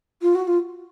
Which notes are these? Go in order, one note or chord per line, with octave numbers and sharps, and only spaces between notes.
F4
F#4
F4